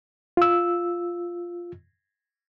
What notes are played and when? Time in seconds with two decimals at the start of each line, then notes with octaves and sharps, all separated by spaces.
0.37 F4 E6